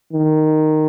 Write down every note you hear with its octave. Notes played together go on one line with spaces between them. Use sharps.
D#3